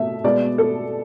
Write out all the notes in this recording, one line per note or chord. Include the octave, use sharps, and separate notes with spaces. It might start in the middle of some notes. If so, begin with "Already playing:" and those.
Already playing: B2 A3 E5
B2 G#3 B3 D5
A4